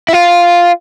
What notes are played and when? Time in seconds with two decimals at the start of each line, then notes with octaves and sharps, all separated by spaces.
0.09 E4
0.13 F4